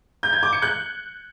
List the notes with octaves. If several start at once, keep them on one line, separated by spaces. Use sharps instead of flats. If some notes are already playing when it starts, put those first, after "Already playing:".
G6
G#6
D6
C#7
F#6